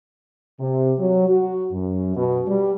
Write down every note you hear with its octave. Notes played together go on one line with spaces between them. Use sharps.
C3
F#3
F#4
F#2
B2
G3